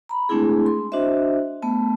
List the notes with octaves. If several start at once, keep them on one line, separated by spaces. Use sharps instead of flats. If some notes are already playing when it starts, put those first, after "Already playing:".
A#5 B5
G#3 A3 C4 D4 E4 G#4
C6
D4 F#4 C5 D#5 E5
A3 B3 A5